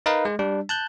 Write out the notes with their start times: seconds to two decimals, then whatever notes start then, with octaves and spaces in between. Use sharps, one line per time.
0.06 D#4 A#4 B4 D#5 F5
0.25 G#3
0.39 G3 D4
0.69 A5 F#6 G6